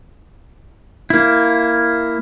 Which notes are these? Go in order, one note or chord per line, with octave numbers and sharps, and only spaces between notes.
A#3 E4